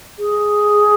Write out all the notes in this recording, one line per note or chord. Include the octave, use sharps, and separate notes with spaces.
G#4